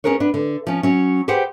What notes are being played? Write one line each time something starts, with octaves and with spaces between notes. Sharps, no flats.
B3 C#4 G#4 A#4 B4 C#5
B3 D4 B4
D3
F3 C#4
F#3 C#4
G4 G#4 B4 C5 F#5 G5